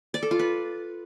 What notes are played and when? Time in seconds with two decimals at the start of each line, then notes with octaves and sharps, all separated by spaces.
0.14 D5
0.23 A4
0.31 F4
0.39 B4